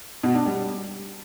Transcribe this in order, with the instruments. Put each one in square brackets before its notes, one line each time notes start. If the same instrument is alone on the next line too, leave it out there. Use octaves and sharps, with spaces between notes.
[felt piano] B2
D4
G3